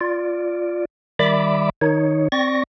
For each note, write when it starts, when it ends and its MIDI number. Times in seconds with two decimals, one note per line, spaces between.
0.01 0.85 65
0.01 0.85 74
1.19 1.70 51
1.19 1.70 55
1.19 1.70 74
1.19 1.70 76
1.19 1.70 83
1.19 1.70 86
1.81 2.28 51
1.81 2.28 63
1.81 2.28 73
2.32 2.63 60
2.32 2.63 74
2.32 2.63 85
2.32 2.63 94